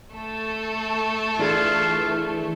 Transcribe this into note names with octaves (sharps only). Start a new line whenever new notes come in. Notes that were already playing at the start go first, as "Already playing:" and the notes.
A3 A4
E3 D4 E4 F4 G#4